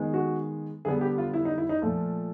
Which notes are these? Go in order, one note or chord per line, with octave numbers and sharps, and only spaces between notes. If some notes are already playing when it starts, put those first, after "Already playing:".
Already playing: D#3 G#3 B3
F#4
D3 G3 B3 G#4
G4
F4
E4
D#4
E4
D#4
A#2 F3 A3